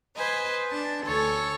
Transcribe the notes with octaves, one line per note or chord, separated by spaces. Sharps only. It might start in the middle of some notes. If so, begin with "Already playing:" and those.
B4 C5 D#5 G#5
D4 A5
D2 A4 C#5 G#5 C#6